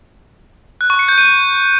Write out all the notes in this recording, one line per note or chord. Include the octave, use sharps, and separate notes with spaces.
F#6
C#6
C#7
G6
D#7